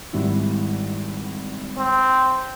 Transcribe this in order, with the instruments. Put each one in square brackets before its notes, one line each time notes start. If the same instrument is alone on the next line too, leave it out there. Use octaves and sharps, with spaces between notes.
[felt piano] G#1 G3 E4
[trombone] C4